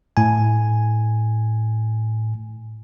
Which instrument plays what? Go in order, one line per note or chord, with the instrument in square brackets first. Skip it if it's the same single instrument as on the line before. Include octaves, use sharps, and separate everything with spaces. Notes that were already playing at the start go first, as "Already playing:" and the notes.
[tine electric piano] A2 G#5